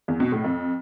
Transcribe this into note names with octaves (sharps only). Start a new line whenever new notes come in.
E2
B2
A2
F2